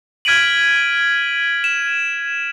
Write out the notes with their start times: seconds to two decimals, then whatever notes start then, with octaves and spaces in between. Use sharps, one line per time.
0.25 F6 G#6 B6 D7 D#7 F#7
1.64 E7